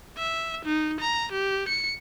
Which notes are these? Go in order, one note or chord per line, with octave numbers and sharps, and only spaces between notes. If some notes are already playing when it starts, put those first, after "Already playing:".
E5
D#4
A#5
G4
C#7